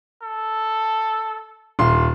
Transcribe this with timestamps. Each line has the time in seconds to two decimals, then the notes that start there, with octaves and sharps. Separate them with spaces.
0.22 A4
1.79 D#1 C6